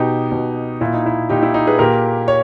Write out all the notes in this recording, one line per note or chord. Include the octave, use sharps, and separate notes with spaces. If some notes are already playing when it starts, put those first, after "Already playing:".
Already playing: B2 D#4 G4
B2
A#2 E4
D#4
E4
A#2 D#4 G4
E4
D#4 G4
G#4 B4
A#2 G4 A#4
C#5